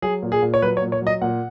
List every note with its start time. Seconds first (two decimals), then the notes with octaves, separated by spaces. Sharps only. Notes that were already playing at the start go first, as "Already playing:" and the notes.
0.02 F#3 G#4
0.23 A#2
0.32 G#4
0.42 A#2
0.54 C#5
0.62 F#3 B4
0.77 C#5
0.82 A#2
0.92 C#5
1.02 F#3 D#5
1.22 A#2 F#5